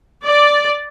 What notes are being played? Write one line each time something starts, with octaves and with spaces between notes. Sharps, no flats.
D5